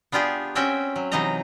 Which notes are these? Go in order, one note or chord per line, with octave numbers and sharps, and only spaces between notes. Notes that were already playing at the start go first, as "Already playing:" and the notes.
B3 D4 F4 G4 G#4
C4 C#4 F#4 E5 G5
F#3
C3 E3 F#3 D#4 D#5 A#5